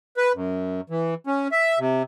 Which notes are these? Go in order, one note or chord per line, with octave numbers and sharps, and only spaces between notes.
B4
F#2
E3
C#4
E5
C3